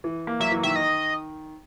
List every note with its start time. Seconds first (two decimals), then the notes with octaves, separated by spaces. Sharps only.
0.04 E3
0.27 A#3
0.40 F#3 E5
0.51 E3
0.63 D#3 E5
0.76 D#5